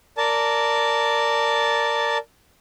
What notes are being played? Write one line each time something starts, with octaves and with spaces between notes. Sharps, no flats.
A#4 D5 A5